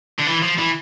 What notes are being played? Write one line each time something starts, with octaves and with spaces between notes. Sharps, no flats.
D3
E3
F3
E3